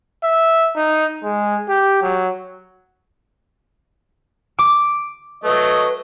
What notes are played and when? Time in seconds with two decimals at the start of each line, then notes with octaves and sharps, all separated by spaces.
0.24 E5
0.76 D#4
1.23 G#3
1.69 G4
2.02 F#3
4.59 D6
5.44 F#3 A3 B4 D#5